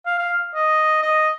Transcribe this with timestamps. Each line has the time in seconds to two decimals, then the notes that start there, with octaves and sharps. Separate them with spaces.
0.06 F5
0.19 F5
0.54 D#5
1.03 D#5